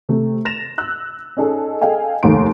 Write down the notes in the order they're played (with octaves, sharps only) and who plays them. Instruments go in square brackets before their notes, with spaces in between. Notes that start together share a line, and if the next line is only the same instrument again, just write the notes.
[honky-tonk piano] C3 A3
A6 A#6 E7 F7
E6 F#6
C#4 D#4 G#4 A4 D#5
G#4 A4 D#5 F5 G5 G#5
F1 D#2 A3 A#3 C6 D7